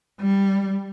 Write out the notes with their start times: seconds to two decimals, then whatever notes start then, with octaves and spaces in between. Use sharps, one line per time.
0.21 G3